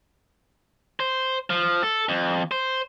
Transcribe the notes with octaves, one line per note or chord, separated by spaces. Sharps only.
C5
F3
A4
F2
C5